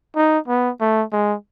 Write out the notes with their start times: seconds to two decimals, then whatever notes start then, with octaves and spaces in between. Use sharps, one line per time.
0.16 D#4
0.48 B3
0.81 A3
1.13 G#3